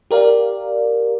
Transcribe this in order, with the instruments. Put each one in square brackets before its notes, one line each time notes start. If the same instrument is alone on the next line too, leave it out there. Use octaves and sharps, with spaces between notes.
[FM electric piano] G4 A#4 D5 F5